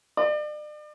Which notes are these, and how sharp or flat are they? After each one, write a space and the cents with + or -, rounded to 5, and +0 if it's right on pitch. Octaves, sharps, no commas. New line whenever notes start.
D5 +40